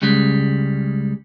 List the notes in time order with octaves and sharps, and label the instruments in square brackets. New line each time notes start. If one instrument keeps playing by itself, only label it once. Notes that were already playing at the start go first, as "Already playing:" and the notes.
[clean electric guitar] C#2 C#3 G3 G#3